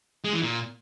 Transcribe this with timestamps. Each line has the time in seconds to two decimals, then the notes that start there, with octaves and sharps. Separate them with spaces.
0.24 G#3
0.33 E3
0.42 A#2